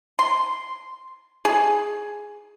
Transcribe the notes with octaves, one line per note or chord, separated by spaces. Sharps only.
C6
G#4